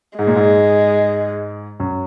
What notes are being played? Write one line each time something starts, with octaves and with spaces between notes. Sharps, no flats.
G#2 G#3
A#2
G#2
F#2